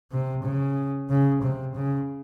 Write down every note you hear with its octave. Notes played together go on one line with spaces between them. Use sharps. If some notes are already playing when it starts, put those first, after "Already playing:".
C3
C#3
C#3
C3
C#3